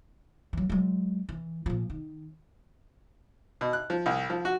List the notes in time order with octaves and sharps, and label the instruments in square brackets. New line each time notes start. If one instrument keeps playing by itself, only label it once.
[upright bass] E3 F#3
F#3 G#3
E3
A#2 F3
D#3
[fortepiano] B2
F#6
F3
C2
F3
F#4